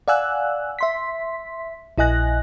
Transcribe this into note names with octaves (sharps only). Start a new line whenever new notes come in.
D5 F5 F#5 G#5 E6 F#6
E5 C6 B6
A#1 E4 D#5 G#5 F#6 A#6